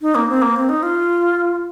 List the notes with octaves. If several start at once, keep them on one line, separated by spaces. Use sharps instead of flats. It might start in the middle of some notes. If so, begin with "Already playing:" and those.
D#4
A#3
C4
A#3
C4
D#4
F4